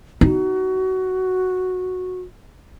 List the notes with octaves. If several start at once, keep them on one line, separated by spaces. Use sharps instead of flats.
D#4 F#4